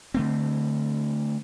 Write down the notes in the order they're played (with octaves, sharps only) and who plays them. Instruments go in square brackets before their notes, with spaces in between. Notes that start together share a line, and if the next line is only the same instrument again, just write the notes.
[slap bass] D3 A3 C4